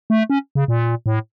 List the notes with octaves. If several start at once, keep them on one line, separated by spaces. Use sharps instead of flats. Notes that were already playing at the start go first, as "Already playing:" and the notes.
A3
C#4
C#3
A#2
A2